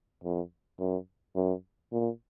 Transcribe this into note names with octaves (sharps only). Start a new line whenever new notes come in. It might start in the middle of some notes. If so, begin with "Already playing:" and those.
F2
F#2
F#2
A#2